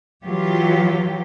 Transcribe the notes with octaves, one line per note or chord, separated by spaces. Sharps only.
E3 F#3 F4 G4